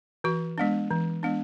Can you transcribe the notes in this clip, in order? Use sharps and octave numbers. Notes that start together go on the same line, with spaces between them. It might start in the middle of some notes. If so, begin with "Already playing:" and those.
E3 F#4
G#3 B3 D4
E3
G#3 B3 D4